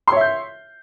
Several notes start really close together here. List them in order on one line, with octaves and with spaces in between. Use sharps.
C6 C#5 E5 G6